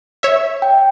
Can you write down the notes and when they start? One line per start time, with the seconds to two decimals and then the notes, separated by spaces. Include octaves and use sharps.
0.23 C#5 E5
0.62 G5